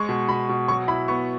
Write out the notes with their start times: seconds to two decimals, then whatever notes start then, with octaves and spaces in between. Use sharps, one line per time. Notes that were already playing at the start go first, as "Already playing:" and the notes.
Already playing: G#3 C#6
0.09 B2
0.29 B2 B5
0.49 B2
0.68 F#3 C#6
0.88 E4 B5
1.08 B3 C#6